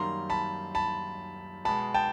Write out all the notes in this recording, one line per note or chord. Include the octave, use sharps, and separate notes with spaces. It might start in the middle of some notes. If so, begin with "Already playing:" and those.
Already playing: F#2 D#3 G3 A#3 A#5 C6
A5 B5
A5 B5
B2 G#3 A5 B5
G5 A5